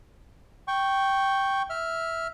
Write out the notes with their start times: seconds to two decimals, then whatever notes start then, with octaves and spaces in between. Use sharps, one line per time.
0.68 G5 C#6
1.70 E5 F6